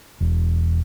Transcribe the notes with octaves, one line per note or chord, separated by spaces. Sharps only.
E1